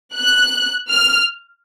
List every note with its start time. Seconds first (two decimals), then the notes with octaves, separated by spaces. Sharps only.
0.16 F#6
0.90 F6